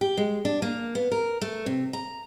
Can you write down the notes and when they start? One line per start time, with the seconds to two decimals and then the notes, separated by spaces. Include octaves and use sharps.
0.01 G4
0.17 G#3
0.45 D4
0.62 A#3
0.95 B3
1.12 A#4
1.41 A3
1.66 C3
1.93 A#5